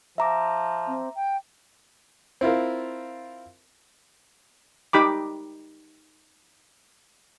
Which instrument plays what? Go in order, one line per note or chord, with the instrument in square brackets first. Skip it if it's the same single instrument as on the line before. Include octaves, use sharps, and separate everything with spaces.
[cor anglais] F3 [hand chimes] E5 A#5 D6
[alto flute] C4
G5
[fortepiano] C4 E4 F4 A#4
[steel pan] D#4 G4 B5 D6